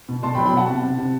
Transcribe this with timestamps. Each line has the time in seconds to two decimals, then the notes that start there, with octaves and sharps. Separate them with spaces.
0.09 B2
0.23 B2 A5 C6
0.35 G5 B5
0.38 F#3
0.46 G5 B5
0.53 B2 F#5 A5
0.68 C3
0.83 C3
0.98 C3